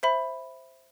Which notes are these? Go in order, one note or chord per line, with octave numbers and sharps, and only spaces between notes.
C5 E5 B5